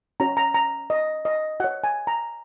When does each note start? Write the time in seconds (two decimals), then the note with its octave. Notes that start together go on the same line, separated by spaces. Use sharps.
0.20 C#4 F#4 C#5 A#5
0.37 A#5
0.54 A#5
0.90 D#5
1.25 D#5
1.60 F#4 C#5 F#5
1.84 G#5
2.07 A#5